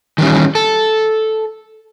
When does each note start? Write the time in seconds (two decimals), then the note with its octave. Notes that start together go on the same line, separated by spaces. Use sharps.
0.18 D#3 E3 G3 C#4
0.55 A4